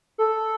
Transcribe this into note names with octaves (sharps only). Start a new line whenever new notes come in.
A4